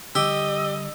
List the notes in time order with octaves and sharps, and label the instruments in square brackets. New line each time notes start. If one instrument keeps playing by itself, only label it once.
[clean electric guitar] D3 G3 [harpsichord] G4 [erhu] D#5 [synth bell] E6